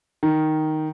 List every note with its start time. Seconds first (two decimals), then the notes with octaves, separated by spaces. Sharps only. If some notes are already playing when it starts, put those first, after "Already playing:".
0.23 D#3